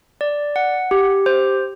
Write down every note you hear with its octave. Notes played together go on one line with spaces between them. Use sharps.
D5
F#5
G4
C5